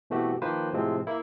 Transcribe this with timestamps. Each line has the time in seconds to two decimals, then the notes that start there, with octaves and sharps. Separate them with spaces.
0.10 B2 E3 A3 C4 F#4 G4
0.42 D#3 F3 A#3 B4 C5
0.73 A2 C3 F3 G#3 C4
1.07 A#3 E4